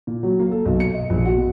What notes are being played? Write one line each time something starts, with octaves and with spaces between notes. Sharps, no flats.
A#2
F#3
A#3
A4
B1
C#7
D#5
A#1
F#4
B3